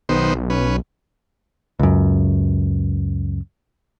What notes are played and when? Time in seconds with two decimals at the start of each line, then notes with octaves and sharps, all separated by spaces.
0.09 B1 D#3 B3 C5
0.50 C#4 B4
1.79 C#2 F#2